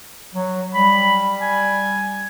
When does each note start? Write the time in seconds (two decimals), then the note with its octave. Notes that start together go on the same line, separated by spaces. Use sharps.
0.35 F#3
0.74 G3 B5
1.41 G#5